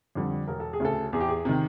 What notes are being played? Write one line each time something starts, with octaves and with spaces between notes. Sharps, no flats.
F2 D3 G3
E1 A#4
A4
G#4
D2 C#3 A4
E2 G#4
G4
G#4
C3 D#3